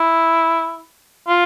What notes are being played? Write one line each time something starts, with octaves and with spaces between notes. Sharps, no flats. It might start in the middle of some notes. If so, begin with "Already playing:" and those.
Already playing: E4
F4